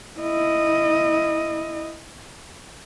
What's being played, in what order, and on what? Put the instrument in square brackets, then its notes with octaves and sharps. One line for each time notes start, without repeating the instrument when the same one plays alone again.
[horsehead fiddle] E4 D#5